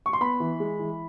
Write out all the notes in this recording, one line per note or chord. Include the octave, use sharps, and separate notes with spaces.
C#6
C6
B3 B5
E3
G#3
E3